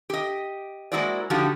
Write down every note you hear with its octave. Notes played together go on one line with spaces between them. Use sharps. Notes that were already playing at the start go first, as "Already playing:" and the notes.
G4 D#5
G#3 A#3 E4 F#4 C5 D5
D3 F3 D#4 F#4 G4